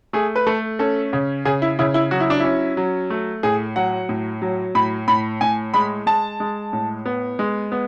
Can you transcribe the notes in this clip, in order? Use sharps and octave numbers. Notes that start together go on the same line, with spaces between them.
A3 G#4
B4
A3 A4
C#4 A4
C#3
C#3 G#4
E4
C#3 E4
E4
F#3 F#4
E4
D4
C#4 E4
F#3
A3
A2 G#4
F#3 F#5
A2
F#3
A2 B5
A2 B5
A2 G#5
G#3 B5
G#3 A5
G#3
A2
B3
G#3
B3